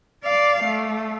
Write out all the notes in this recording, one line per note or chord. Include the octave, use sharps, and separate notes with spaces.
D5 F5
A3